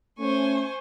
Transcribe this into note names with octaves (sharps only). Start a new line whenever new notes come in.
A3 C#4 C5 G#5 C#6